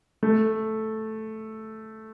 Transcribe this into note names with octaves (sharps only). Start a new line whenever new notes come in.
A3